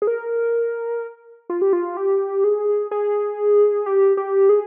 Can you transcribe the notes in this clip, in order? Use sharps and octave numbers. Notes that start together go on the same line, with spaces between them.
G#4
A#4
F4
G4
F4
G4
G#4
G#4
G4
G4
G#4